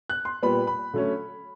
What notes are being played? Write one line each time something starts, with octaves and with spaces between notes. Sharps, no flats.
F#6
C6
A#2 G3 B3 B5
B5
D3 F#3 A3 C#4